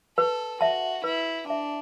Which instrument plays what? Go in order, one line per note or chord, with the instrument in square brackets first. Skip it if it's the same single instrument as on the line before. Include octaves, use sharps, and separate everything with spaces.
[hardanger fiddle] A4 [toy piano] B4
[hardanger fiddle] F#4 [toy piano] E5 A5
[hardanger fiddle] E4 [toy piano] B4
[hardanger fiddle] D4 [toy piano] E5 A5